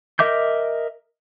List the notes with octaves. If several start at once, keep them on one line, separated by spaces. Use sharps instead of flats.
A#4 D#5 E5 D6 G6